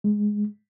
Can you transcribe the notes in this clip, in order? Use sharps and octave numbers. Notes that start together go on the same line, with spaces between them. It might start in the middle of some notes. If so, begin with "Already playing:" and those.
G#3